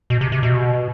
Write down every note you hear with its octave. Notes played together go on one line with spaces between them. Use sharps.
B2
C3
C3
B2